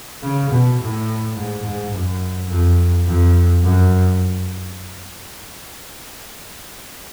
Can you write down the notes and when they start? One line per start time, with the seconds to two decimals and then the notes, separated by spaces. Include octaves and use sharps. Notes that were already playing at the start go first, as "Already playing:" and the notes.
0.23 C#3
0.50 B2
0.79 A2
1.35 G#2
1.64 G#2
1.93 F#2
2.49 F2
3.06 F2
3.62 F#2